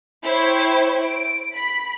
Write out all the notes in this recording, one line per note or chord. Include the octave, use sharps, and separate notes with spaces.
E4 C5 C#5 G5
D7
B5 B6